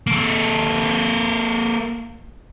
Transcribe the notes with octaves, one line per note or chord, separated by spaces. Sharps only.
A#3 A4